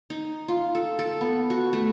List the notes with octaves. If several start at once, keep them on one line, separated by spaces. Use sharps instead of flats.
D#4
F4
A4
A4
B3
F#4
A3